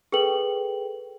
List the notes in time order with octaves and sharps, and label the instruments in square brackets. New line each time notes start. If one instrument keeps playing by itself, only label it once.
[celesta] G#4 A4 B4 G5 F#7